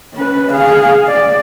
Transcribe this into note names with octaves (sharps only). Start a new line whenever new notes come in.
C#4 B4
G#4 F5
D5